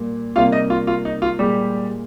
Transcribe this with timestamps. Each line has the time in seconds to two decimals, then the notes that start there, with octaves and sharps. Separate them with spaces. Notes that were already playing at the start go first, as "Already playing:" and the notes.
Already playing: A#2 G3 A#3
0.36 C3 G3 A#3 F4 F5
0.52 D#4 D#5
0.70 F4
0.87 F4
1.05 D#4
1.22 F4
1.39 A#2 G3 G#3 G4